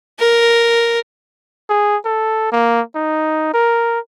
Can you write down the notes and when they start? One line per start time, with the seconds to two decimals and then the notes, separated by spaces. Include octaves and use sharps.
0.19 A#4
1.69 G#4
2.05 A4
2.52 A#3
2.95 D#4
3.54 A#4